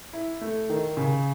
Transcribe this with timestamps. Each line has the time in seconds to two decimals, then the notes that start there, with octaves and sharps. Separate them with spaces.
0.13 E4
0.41 A3
0.70 D#3
0.97 C#3